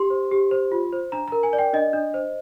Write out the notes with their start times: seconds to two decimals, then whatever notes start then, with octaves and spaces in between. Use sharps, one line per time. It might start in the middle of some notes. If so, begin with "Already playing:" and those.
Already playing: G4 C6
0.10 C5
0.31 G4
0.51 C5
0.72 F4
0.92 C5
1.12 D4 A#5
1.28 A#4 A#5
1.43 G#5
1.53 D5
1.59 G5
1.73 D4 D#5
1.93 D4
2.14 C5